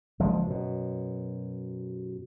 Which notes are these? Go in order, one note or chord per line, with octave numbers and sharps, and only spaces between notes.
F#1 F3 G#3
F#2 B2